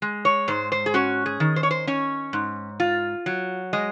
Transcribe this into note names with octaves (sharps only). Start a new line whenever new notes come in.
G#3
C#5
G#2 C5
C5
G#4
C#4 F#4
G#4
D#3
C5
C#5
C5
C#4 C#5
G#2
F4
F#3
G#3 D#5